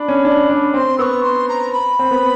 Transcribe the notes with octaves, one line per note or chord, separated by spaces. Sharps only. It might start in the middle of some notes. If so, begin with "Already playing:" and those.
Already playing: D4 B5
C#4
D4
D4
C4 C6
B3 C#6 E6
C6
A#5
B5
C4
B3